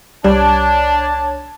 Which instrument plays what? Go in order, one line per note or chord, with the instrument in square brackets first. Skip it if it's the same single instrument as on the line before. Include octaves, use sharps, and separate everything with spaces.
[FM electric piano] C2 C#5 G#6 [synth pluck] G3 [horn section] D4 [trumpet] A5